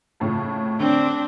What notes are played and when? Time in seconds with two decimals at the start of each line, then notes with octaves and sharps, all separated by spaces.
0.20 F2 A2 C#3
0.80 D3 C4 D4